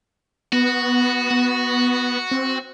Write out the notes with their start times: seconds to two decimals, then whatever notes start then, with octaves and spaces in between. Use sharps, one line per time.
0.53 B3 F#4
1.31 B3
2.31 C4